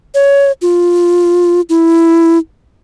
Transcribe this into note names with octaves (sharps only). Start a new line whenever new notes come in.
C#5
F4
E4